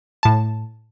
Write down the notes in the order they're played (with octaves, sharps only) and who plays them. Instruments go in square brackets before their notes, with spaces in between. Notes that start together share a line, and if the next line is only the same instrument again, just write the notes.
[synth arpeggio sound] A2 A5